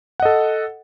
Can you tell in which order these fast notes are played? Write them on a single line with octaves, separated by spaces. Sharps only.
F#5 D#5 A4